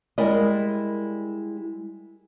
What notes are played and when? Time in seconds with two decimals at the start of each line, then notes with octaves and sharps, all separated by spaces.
0.18 G3 G#3 E4 A#4 D5 D#5